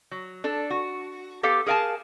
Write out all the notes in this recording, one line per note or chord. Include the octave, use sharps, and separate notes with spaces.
F#3
D4 A4
F#4
B3 G4 A4 F5
G#4 A#4 F5 G#5 A5